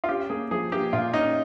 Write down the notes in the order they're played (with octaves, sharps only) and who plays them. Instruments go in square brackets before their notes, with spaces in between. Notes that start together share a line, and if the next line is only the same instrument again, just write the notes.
[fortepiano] F4
[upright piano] C#4 [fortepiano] G4
[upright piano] A#3 [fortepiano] G#4
[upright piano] F3 [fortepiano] G#4
[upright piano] A#3 [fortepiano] G4
[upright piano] A#2 [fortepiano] F4
[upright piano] C#4 [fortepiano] D#4